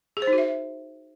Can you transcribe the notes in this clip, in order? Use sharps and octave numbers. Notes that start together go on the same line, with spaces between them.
G#4
C5
D#4
F#4
E5